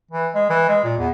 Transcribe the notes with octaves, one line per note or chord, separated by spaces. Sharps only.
E3
G#3
E3
G#3
A#2
E2